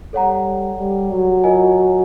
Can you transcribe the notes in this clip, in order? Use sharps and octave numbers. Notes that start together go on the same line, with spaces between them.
G3 A4 C#5 F#5 A#5
G3
F#3
F4 A#4 D#5 G#5